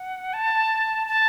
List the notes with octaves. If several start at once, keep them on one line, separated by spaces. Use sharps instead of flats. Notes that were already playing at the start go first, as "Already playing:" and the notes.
Already playing: F#5
A5
A5